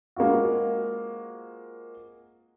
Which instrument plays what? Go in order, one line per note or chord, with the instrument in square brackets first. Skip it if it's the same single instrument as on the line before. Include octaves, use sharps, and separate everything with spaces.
[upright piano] G#3 A#3 C4 F4 F#4